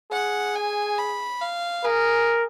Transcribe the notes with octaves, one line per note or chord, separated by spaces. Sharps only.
G#4 F#5
G#5
B5
F5
G#4 A#4